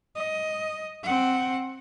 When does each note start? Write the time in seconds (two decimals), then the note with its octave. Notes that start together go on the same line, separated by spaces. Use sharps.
0.15 D#5
1.03 C4 F#5